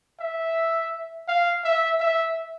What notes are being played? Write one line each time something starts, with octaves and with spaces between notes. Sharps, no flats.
E5
F5
E5
E5